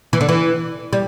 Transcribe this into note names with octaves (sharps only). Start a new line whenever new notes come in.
E3
D3
E3
G3